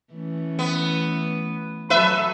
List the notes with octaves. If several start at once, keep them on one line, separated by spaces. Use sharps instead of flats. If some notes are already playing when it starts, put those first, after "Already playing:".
E3 A3 C#4
B3
F#3 A4 B4 E5